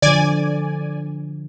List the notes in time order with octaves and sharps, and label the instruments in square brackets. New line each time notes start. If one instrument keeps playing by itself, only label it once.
[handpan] D3 F3 [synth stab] D5 G#5